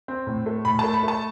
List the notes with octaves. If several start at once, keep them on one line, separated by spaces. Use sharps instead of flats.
C4
A2
A3
A2 B5
A3 A5
B5
A3 A5